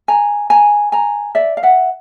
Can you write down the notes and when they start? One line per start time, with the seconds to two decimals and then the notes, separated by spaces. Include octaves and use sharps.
0.08 G#5 A#5
0.50 G#5 A#5
0.92 G#5 A#5
1.35 D5 E5
1.57 F5
1.63 E5 F#5